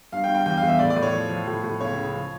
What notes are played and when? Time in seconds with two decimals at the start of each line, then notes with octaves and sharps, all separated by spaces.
0.12 G2 F5
0.24 G5
0.29 G2
0.35 G5
0.46 E2 G5
0.57 F5
0.63 E2
0.68 E5
0.79 A2 D5
0.90 D5
0.96 A2
1.02 C#5
1.14 F3
1.30 F3
1.47 A2
1.64 A2
1.81 C#2 C#5
1.97 C#3
2.14 F3